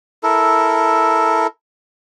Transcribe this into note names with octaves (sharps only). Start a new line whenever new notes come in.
E4 A4 A#4